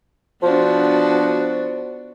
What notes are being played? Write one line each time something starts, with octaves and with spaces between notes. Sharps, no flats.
F3 B3 D4 F#4